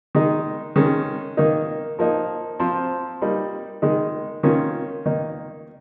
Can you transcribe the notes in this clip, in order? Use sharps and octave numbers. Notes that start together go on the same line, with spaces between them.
D#3 G#3 D#4
D#3 G#3 C#4
D#3 A#3 D#4
F3 A#3 D#4
F3 C4 F4
G3 A#3 D#4
D#3 G#3 D#4
D#3 A#3 C#4 F4
D#3 A#3 D#4